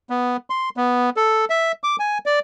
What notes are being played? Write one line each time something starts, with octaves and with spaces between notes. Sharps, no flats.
B3
C6
B3
A4
E5
D6
G#5
D5